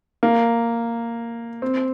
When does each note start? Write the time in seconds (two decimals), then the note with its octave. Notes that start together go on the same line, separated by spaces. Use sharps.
0.23 A#3
1.62 C4